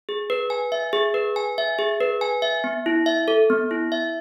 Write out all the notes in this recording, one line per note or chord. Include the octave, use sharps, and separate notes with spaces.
G#4
B4
G#5
E5
G#4
B4
G#5
E5
G#4
B4
G#5
E5
B3
E4
E5
A4
B3
E4
E5